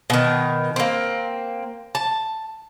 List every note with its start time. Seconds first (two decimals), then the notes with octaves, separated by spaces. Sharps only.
0.10 B2 D#3
0.76 A#3 C4
1.95 A5